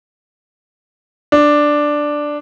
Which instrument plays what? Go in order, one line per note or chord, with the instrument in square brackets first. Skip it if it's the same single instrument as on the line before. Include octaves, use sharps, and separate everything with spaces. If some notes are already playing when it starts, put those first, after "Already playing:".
[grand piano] D4